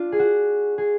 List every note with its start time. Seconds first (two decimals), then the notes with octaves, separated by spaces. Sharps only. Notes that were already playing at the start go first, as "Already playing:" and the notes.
Already playing: D4 F4
0.12 G#4
0.19 F#4
0.78 G#4